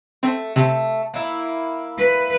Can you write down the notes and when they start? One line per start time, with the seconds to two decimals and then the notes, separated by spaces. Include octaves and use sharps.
0.23 A3 C4
0.56 C3 A3
1.14 A#3 E4
1.99 B4